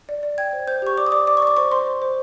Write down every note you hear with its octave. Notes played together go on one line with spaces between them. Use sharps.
D5
D5
G5 G#6
C5
C5 G6
G4 C#6
D5 D6
D#6
D5 D6
D5 D6
C#6
D5 D6
C5 C#6
C5 C6
C5
C5